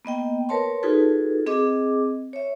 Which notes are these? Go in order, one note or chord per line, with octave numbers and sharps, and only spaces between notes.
A#3 B3 D#5 G5
A#4 B4 C#5 A5 C6
D#4 F4 F#4 G#4 A4 B4
C4 G#4 D#5 D6
C#5 E5